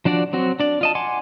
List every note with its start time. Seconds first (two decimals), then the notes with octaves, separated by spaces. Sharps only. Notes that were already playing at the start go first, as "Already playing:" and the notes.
0.05 F3 D4 F#4 D5
0.33 F#3 C4 F#4
0.60 D4 D5
0.81 F4 D#5 A5
0.95 F#5 G#5 C6 D6